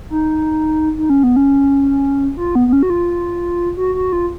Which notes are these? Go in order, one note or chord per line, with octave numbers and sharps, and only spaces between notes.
D#4
D#4
C#4
B3
C#4
F4
B3
B3
C#4
F#4
F4
F#4
F#4
F4